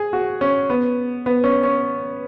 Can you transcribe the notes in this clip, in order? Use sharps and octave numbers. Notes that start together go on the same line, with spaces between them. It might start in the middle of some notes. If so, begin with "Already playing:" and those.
Already playing: G#4
F#4
C#4
B3
B3
C#4
C#4